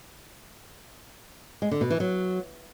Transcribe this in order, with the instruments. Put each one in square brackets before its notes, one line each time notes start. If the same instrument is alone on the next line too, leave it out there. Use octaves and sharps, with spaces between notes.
[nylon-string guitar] G#3
D3
B2
E3
F#3